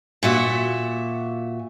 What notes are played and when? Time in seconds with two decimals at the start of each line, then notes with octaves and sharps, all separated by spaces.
0.23 A#2 F#4 E5